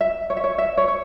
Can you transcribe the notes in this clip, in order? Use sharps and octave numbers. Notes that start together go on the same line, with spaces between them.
E5
C#5
E5
C#5
E5
C#5
C#5